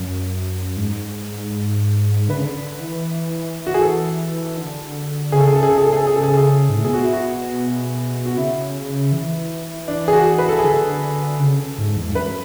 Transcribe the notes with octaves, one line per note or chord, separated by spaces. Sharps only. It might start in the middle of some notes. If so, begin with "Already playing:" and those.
Already playing: F#2
G#2
D3 B4
C#3
D3
D3
E3
F#4
G#4
A4
D3
C#3 G#4
A4
G#4
A4
G#4
A4
G#4
A4
G#4
A4
G#4
A4
G#4
A4
G#4
G#2
A2
B2 G#4
F#4
E4
F#4
F#4
C#3 E4
E3
D4
G#4
F#4
B4
A4
G#4
D3
A4
C#3
G#2
E2
G#2
F#2 B4